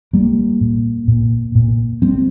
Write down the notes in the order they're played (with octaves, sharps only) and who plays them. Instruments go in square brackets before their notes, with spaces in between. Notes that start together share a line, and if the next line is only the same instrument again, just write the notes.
[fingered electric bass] G3 [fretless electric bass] A#3
[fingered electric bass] A#2
A#2
A#2
[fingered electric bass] G3 [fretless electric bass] C4